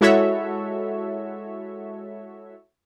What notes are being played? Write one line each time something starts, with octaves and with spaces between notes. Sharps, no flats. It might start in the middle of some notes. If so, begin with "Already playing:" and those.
G#3 E4 F#4 A4 C#5 E5